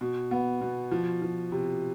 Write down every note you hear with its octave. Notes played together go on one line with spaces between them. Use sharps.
B2
B3
B2
F3
F3
C3